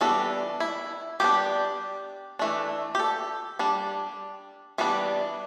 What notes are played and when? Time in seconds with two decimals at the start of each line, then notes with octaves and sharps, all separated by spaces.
0.01 E3 G3 B3 D4 A4
0.60 E4
1.20 G3 B3 D4 G4
2.39 E3 A3 D4
2.95 G4
2.99 A4
3.59 G3 D4
4.78 E3 G3 B3 D4